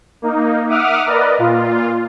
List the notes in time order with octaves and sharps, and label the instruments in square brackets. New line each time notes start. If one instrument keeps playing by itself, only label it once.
[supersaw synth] A#3 D#4
E5 F#5 D6 D#6 F6
A#4 B4 D5 D#5
A#2 F4